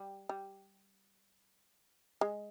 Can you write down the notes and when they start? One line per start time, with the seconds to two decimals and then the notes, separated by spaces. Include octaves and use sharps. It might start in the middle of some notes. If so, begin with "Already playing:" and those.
Already playing: G3
0.29 G3
2.21 G#3